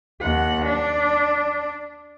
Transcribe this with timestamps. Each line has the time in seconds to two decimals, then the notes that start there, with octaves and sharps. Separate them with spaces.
0.21 D#2 F#5
0.66 D4